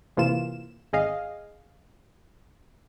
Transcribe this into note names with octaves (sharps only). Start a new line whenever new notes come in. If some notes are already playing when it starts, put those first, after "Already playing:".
A1 C3 E3 A#3 F4 E7
G#1 G#4 D#5 F5